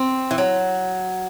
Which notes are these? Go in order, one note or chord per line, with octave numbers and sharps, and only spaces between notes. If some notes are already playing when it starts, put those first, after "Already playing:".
Already playing: C4
E3
F#3